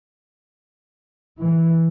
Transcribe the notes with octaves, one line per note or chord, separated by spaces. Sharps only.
E3